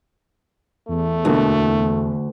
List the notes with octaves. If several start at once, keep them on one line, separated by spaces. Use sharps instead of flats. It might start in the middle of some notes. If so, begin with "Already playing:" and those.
E2 A3
D2 B2 D3 A#3